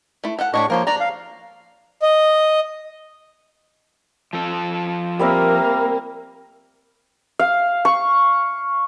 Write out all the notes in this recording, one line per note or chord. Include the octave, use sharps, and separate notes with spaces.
A3 E4
A4 F5 F#5
A2 D4 G4 C#5 D#5 C#6
F3 A#3 A#4 C5 C#5
D4 D5 A#5
F5
D#5
F3 A4
G3 A#3 C4 A#4 E5
F5
C#6